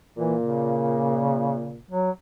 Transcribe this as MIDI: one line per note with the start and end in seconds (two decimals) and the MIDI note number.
0.18 1.78 46
0.18 0.35 52
0.18 1.78 58
0.40 1.82 49
1.91 2.10 54